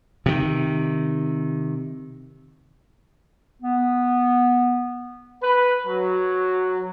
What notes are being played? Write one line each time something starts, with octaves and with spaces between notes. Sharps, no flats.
C3 D#3
B3
B4
F#3